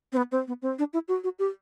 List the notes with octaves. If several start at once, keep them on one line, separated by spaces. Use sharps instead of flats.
C4
B3
C4
B3
C4
D4
E4
F#4
F#4
G4